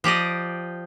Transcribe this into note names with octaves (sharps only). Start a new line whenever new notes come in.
F3 G4 D5 D#5